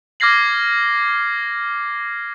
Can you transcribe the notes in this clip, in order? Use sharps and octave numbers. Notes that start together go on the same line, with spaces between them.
D6 F6 G#6 A#6 C7 F#7